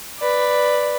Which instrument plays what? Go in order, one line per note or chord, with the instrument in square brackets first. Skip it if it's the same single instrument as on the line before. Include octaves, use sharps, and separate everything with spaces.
[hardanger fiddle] B4 D5